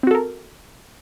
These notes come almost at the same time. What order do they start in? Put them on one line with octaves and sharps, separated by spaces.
C4 F#4 A4 A#4